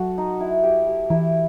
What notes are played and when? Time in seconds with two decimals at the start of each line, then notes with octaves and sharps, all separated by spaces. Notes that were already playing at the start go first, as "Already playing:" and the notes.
Already playing: F#3 F#4 A4
0.18 D#4
0.40 E4
0.63 G4
0.87 G4
1.10 E3 E4